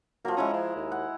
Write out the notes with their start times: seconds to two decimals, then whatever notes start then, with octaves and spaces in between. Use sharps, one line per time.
0.25 F3 F#3 A#3
0.37 G#3 C#4 E4 A#5
0.53 F3
0.76 D#2
0.92 F#5